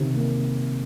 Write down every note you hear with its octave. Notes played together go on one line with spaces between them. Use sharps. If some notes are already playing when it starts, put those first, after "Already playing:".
Already playing: C3 D#3 C#4
A#3